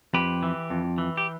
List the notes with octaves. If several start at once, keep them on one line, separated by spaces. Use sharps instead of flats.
F2 G4 B4
E3
F2
E3
G4